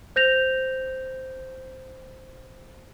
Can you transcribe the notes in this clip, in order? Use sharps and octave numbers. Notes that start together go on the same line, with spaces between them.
C5 G6 A#6 F7